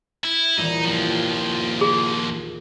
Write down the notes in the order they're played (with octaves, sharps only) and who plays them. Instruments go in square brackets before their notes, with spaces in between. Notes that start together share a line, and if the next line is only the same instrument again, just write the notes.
[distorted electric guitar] E4
[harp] D#1 E3 [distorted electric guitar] D#4
[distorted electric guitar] D#2 F3
[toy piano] G#4